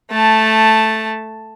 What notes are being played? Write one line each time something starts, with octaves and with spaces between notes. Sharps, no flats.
A3 A5